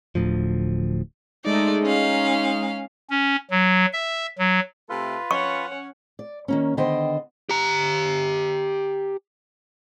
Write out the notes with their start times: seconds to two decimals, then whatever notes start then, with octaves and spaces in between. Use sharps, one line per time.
0.15 D1 D2 A2 F3
1.45 G#3 A3 D#4 D5
1.83 C#4 F5
3.10 C#4
3.51 F#3
3.93 E5
4.39 F#3
4.90 C3 A3 F4 A4 B4
5.31 C#4 C#5 F#5 C#6
6.19 D5
6.48 D#3 A#3 C#4
6.77 D3 D#3 B3 C5 D#5 G5
7.49 G4 A#5